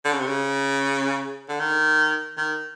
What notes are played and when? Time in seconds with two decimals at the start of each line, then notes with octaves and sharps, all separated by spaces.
0.05 D3
0.12 C#3
0.19 C3
0.27 C#3
1.48 D3
1.60 D#3
2.37 D#3